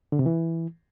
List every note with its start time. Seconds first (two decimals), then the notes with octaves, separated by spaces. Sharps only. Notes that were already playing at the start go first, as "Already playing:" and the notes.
0.12 D3
0.19 C3
0.26 E3